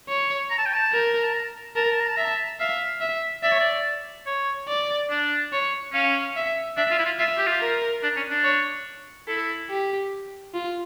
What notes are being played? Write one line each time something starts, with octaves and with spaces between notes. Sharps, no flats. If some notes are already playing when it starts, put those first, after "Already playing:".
C#5
A#5
A5
G5
A5
A#4
A5
A#5
A#4 A5
A#5
A5
A#5
A5
E5 A#5
A5
E5 F5
E5
D5 E5
C#5
D5
C#5
D5
D4
C#5
C#4 F5
E5
D4 E5
F4
E4
F4
F4 E5
G4
F4
A#4
D4
C#4
D4
C#5
E4 A4
G4
F4